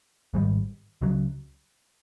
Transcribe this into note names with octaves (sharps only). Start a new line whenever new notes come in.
G#1 G#2 D#3 G3
C#2 C#3 F#3